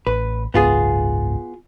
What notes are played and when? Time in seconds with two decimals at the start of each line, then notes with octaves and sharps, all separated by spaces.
0.07 A1 B4
0.54 F#1 C#2 G#2 B3 F4 G#4